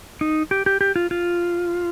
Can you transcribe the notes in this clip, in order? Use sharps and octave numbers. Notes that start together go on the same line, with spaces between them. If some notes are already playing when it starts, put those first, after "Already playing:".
D#4
G4
G4
G4
F4
F4